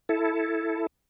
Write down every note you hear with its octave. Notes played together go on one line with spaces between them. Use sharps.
E4 A4